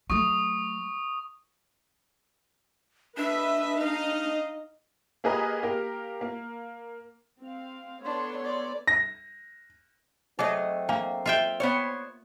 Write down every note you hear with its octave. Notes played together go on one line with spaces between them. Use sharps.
F#3 A3 C#6 D#6
D4 B4 D#5 E5
D#4 D#5 F5
A#3 G4 G#4 B4 D#5 A#5
A#3 G4 A#4
A#3
C4 F5
B3 D4 A4 C#5 C6
D5
A#6
F#3 A3 C4 D#4 G#4 D#5
A#3 D4 F5 A#5
F4 E5 G5
B3 C5 C#5